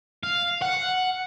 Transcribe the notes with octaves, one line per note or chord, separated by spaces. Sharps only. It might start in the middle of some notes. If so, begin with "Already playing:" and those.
F5
F#5